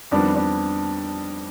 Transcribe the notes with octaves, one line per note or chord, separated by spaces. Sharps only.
F2 D#3 G3 B3 D4
D4